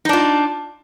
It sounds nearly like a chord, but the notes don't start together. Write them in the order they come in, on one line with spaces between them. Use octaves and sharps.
D#4 D4 F4